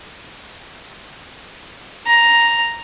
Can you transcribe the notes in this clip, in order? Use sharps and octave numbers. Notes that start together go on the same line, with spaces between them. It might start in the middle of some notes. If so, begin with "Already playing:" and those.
A#5